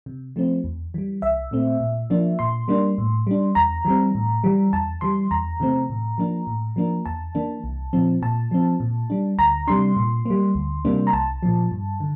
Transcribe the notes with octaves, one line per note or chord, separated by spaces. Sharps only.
C3
F3 A3 C4
E2
E3 G3
C2 E5
A#2 A3 C4
A#2
F3 A#3 D4
A#2 C6
G3 A#3 D4
A2
G3 D4
E2 A#5
E3 G3 C4
A2
E3 G3
E2 A5
E3 G3 C6
E2 A#5
C3 E3 A3 C4
A2
F3 A#3 D4
A2
F3 A#3 D4
E2 A5
E3 A#3 D4
C2
A#2 F3 C4
A#2 A5
F3 C4
A#2
G3 D4
D2 A#5
C3 G3 D4 C6
A#2
G3 A#3
D2
C3 G3 A#3 D4
A#5
C2 A5
A#2 F3
G2
D3